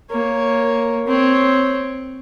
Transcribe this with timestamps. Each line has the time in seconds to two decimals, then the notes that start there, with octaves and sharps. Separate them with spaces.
0.11 A#3 C#5
1.07 C4 C#5